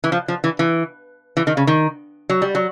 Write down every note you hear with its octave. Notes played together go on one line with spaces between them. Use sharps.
E3
F3
F3
E3
E3
E3
D#3
C#3
D#3
F#3
G3
F#3